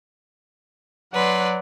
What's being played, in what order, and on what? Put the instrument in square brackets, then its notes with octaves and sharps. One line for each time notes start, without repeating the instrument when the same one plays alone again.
[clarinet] F#3 [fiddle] B4 C6 [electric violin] D5 F#5